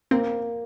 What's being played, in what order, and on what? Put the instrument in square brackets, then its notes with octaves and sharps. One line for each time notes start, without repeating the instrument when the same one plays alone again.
[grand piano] A#3 [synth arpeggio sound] C4